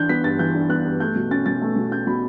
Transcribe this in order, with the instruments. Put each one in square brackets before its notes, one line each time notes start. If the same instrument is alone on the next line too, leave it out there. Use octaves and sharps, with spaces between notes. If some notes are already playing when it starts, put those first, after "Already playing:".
Already playing: [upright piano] E3 D4 F#6 G6
B3 B6
G2 A6
E3 G6
D4
B3 F#6
G2
A3 G6
B2
C#4 A6
B2 A6
A3
B2
C#4 G6
B2 B5